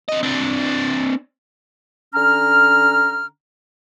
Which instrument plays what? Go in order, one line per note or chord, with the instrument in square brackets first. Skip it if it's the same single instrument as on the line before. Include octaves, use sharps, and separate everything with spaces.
[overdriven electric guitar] C4 D#5
C4 D4
[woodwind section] D3 C#4 A#5 F6